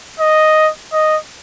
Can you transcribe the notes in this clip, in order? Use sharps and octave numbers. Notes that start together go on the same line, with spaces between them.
D#5
D#5